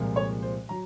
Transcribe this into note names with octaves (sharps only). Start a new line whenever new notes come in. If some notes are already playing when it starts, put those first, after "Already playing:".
Already playing: C2 A#2 F3 G#3
C#5
C5
F#3 A#5